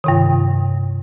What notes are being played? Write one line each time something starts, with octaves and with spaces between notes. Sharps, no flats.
G2 C3 D#3